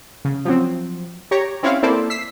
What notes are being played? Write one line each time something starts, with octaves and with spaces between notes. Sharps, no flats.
C#3
F3 F#3 C4
G4 C#5 A#5
C4 C#4 E4 C#5 F5
A#3 C4 E4 A4 C5 D5
E6 B6 C7